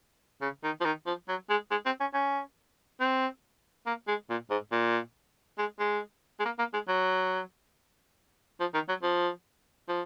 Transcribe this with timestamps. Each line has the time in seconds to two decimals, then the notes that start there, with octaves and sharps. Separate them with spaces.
0.41 C#3
0.64 D#3
0.81 F3
0.85 D#3
1.06 F3
1.28 F#3
1.50 G#3
1.71 G#3
1.86 C4
2.00 C#4
2.14 C#4
3.00 C4
3.86 A#3
4.08 G#3
4.30 A#2
4.50 G#2
4.72 A#2
5.58 G#3
5.79 G#3
6.39 G#3
6.45 A#3
6.59 A#3
6.74 G#3
6.88 F#3
8.60 F3
8.74 D#3
8.88 F#3
9.03 F3
9.88 F3